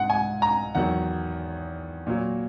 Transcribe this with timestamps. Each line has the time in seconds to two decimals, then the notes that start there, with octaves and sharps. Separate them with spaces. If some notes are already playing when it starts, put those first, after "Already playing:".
Already playing: G#2 F#5
0.10 G#5
0.42 A#5
0.75 E2 D#3 F#3 F#5
2.07 A#2 F#3